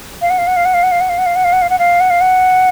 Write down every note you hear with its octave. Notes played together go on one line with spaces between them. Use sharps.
F5
F#5
F5
F#5
F5
F#5
F5
F#5
F5
F#5
F5
F#5
F5
F#5
F5
F#5
F5
F#5
F5
F#5
F5
F#5